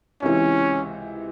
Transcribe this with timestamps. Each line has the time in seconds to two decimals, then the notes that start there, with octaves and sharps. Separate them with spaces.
0.22 C#2 C3 E3 C#4